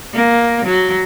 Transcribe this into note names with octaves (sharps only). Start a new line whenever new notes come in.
A#3
F#3